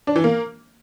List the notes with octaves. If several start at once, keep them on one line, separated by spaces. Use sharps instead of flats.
D4
E3
A#3